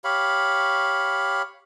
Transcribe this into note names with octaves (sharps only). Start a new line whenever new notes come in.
G4 C#5 F5 B5